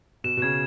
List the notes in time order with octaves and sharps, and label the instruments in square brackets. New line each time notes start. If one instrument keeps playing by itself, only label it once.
[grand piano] B2 [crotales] E7
[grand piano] B2
[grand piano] C#3 [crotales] G#6